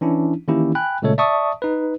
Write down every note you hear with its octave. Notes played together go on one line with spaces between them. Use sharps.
E3 C#4 D4 E4
D#3 E3 A#3 C#4 E4 G4
G5 G#5 B5 F#6
A#2 C#3 G#3 A3 A4 C#5
D5 E5 A5 C#6 D#6
D#4 B4